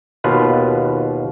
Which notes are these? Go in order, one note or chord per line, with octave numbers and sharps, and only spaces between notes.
D#2 B2 F4 B4